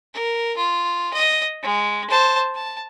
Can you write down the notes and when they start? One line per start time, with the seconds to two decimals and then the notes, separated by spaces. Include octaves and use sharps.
0.14 A#4
0.57 F4
1.13 D#5
1.62 G#3
2.10 C5 A5
2.55 A5